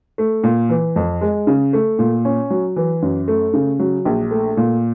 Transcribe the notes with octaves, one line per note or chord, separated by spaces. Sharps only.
A3
A#2
E3
F2
G#3
C#3
A3
A#2
C#4
F#3
E3
F#2
A3
C#3
F#3
A#1
A3
A#2